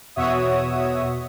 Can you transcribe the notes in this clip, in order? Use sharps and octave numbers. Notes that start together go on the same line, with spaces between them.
E2 B2 F#4 C#5 E5 D#6